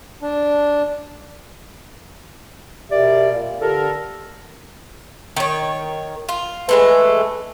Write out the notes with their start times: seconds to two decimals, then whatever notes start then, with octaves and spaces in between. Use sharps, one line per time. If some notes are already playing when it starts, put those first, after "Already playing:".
0.22 D4
2.91 B2 G4 A#4 D5 E5
3.32 A#2
3.62 D3 G4 A4 A#4
5.36 D#3 C#5
6.29 F4
6.69 E3 G#3 A3 B4